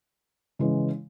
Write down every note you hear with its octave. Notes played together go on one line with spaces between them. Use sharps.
C#3 E3 G#3